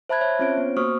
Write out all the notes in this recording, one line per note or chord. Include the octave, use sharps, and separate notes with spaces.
C5 E5 A5 B5 F#6 G#6
C#5 E5 A5 F#6
C4 C#4 F4 C5 C#5 D7
B3
A#3 F#4 C5 C#6 D#6 F6